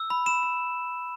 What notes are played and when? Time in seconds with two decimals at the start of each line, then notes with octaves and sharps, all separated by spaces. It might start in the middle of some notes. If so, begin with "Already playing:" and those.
Already playing: E6
0.10 B5
0.26 B5 E7
0.43 B5